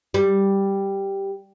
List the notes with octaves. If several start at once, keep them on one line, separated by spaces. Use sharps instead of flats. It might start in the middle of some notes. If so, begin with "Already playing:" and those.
G3